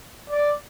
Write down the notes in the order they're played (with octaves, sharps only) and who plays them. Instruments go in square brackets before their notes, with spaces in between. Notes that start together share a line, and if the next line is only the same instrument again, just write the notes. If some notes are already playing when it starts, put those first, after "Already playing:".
[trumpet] D5